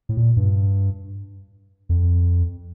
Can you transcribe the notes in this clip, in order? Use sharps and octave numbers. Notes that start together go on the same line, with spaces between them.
A2
A#2
G2
F2